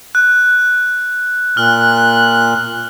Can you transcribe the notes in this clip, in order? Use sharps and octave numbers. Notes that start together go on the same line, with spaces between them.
F#6
A#2 F6 F#6